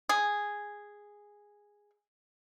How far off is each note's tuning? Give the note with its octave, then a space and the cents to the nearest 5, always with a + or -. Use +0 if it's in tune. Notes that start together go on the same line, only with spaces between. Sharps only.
G#4 -5